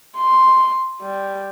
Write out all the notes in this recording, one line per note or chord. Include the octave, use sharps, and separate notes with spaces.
C6
G3